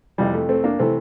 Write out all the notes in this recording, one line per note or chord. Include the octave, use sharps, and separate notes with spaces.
F2 C3 E3 G3
A3
A3 C4
A#3 D4
C3 E3 A3 C4